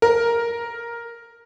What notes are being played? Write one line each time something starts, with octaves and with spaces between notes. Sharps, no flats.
A#4